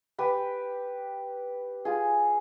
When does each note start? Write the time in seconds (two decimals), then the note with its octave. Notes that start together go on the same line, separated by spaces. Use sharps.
0.18 G4 B4
1.85 F4 G#4